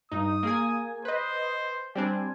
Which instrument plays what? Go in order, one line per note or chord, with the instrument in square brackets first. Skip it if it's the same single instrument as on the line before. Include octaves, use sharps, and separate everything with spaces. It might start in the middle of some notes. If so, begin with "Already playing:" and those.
[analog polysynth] G2 D#4 [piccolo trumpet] D#6
[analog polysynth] A#3 G#4 G#5
[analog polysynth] B4 D#5 [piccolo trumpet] C5
[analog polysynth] G3 C4 D4 [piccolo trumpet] G#5